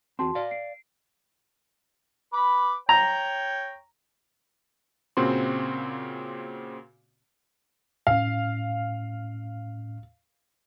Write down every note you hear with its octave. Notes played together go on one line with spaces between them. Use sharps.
E2 C4 F#4 A5 C6
D5 F5
C7 D7
B4 B5 D6
C#5 G5 A#5
A#2 C#3 C4 F#4 C6
A2 C#4 F5